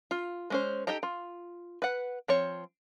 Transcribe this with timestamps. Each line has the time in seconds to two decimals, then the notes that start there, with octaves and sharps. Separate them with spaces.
0.11 F4
0.50 G#3 C#4 C5
0.87 D#4 G4 A4 D#5 A#5
1.03 F4
1.82 B4 F#5
2.28 F3 C4 C#5